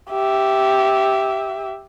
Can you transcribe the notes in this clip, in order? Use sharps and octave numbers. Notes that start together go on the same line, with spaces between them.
G4 E5